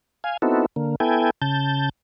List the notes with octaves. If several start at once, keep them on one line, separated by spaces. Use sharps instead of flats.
F5 G#5
B3 C4 D#4 E4 F#4 A4
D3 A#3
B3 E4 A4 G5 G#5
C#3 A5 G6